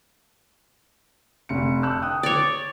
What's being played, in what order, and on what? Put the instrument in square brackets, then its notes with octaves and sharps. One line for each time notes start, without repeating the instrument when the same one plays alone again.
[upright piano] F1 C#7
A5 E6 F#6
G5 D#6 F#6
[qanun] C#5 D5